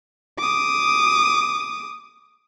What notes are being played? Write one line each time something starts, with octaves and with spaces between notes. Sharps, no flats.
D6 D#6